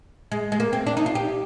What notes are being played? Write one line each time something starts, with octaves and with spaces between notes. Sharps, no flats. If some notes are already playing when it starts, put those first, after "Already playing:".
G#3
G#3
A#3
C4
D4
D#4
F4
G4